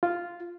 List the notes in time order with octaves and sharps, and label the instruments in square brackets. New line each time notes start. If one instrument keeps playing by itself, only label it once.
[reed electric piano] F4